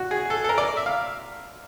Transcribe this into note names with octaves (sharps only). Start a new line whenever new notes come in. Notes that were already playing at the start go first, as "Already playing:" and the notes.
Already playing: F#4
G#4
A4
A4
A#4
D5
E5
F5